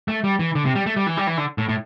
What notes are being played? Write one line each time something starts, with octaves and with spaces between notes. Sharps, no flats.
A3
G3
E3
D3
C3
G3
A3
G3
E3
G3
E3
D3
A2
A2